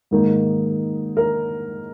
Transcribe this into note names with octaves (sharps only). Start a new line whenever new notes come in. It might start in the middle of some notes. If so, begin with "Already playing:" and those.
G#2 D#3 A#3
A#4